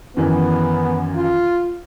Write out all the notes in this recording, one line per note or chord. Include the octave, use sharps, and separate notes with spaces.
F#2 D#3 E3 B3
F4